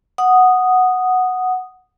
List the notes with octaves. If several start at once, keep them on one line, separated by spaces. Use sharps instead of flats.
F#5 D#6